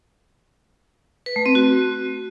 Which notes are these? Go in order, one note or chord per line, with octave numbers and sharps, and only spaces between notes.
B4
A3
C4
F#4